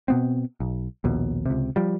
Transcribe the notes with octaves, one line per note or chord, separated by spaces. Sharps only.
B2 B3 C4
B1
A#1 D#2 B2
C#2 C3
F3 G3